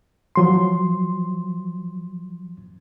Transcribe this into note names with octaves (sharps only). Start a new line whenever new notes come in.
F3 F#3 C6